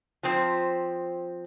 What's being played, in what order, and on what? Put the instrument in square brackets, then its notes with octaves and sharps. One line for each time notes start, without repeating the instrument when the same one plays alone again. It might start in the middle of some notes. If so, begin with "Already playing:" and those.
[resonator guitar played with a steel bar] F3 C4